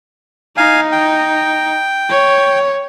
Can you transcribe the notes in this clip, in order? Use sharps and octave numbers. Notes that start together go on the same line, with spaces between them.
D#4 F5 G#5
G5
C#5